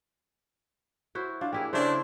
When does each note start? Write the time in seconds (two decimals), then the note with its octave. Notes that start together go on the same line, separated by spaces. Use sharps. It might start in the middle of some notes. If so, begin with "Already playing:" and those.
1.15 E4 F#4 C5
1.41 D4 F4
1.52 A#3 E4 G4 G#4
1.73 C#3 A3 D4 E4 C5